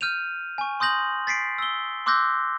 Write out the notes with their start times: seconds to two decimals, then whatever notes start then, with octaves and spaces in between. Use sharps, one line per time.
0.01 F6 G6 D#7 F7
0.58 G#5 C#6
0.80 C6 D#6 G6 A#6 F#7
1.27 A6 B6 C7 D7
1.58 E6 G7
2.06 C6 D6 E6 F#6 G6 A#6